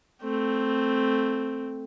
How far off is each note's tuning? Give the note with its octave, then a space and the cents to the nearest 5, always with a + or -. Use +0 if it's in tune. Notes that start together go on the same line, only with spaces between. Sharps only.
A3 +0 C4 +0